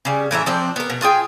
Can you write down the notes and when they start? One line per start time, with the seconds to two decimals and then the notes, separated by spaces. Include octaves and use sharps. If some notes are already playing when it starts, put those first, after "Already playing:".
0.05 C#3 G3
0.31 A2 E3 A#4 E5
0.46 F3 C4 D4
0.76 B3 A#4
0.90 B2
1.02 F4 G#4 G5